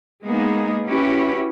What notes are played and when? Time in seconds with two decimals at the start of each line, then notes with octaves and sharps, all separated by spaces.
0.23 G#3 A#3 B3 D#4 G#4
0.87 C#4 E4 F#4 G4 B4